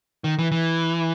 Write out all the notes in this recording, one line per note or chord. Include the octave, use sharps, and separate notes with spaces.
D#3
E3
E3